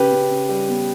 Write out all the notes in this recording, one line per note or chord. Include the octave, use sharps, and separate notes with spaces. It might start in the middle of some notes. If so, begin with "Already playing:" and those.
Already playing: C#3 G4 B4
C#3
C#3
G3
B3